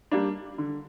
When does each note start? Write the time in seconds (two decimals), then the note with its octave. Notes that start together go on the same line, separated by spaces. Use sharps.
0.12 G3 A#3 D4
0.58 D3